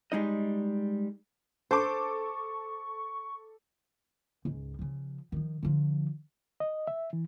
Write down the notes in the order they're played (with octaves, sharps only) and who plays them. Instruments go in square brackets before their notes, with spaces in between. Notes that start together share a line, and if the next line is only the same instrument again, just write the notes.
[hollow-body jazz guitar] G3 G#3 D#4 D#5
[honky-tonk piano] A4 A5 D6 [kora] C5 [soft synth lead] C#6
[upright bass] C#2 G#2
C#3 F3
D#3 F3
D3 F3
[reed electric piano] D#5
E5
E3